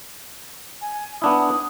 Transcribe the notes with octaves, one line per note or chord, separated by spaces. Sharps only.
G#5
B3 D4 E4 D#6